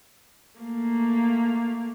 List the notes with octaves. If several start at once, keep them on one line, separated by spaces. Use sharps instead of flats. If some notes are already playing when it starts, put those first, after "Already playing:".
A3 A#3